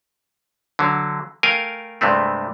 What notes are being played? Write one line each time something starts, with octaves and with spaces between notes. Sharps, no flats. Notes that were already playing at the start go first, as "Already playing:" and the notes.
D3 F#3
A3 A#4 F5 G5 G#5
G2 C3 G#3 A3 C4